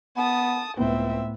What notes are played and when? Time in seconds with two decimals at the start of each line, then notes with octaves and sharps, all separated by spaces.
0.17 B3 A5 D#6
0.77 C#2 A2 B3 C4 E5